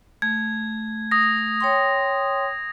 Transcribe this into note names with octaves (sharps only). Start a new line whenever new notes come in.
A3 G#6
D#6 A#6
C#5 G5 C6